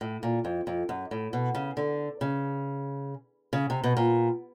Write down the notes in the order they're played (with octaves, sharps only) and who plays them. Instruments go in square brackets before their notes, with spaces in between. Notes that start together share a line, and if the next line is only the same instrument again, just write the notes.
[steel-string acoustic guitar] A2
A#2
F2
F2
F#2
A2
B2
C#3
D3
C#3
C#3
C3
B2
A#2